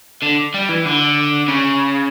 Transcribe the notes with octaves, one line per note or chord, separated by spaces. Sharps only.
D3
G3
E3
D3
C#3